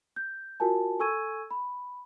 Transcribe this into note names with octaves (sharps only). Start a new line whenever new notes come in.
G6
F4 F#4 A#4 G#5 A5
A4 G#5 C#6 E6 G#6 D#7
B5